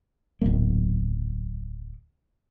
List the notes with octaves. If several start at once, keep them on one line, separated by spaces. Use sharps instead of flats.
D1 B1 A#2 A#3